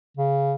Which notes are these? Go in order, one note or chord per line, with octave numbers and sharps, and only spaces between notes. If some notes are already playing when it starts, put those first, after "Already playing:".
C#3